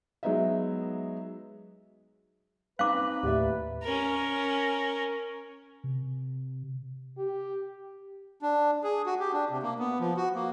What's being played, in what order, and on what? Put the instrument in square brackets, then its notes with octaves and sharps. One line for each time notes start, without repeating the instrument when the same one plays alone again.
[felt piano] F#3 G#3 B3 D#4 D#5 E5
[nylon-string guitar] C4 C#4 D#4 [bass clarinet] B4 [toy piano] F5 D6 [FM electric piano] F#6
[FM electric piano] D#2 A2 [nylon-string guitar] G4 D5 E5
[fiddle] C#4 A#4
[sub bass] C3
[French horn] G4
[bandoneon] D4
G#4
F#4
G4
D4
C3
A#3
B3
F3
F#4
A#3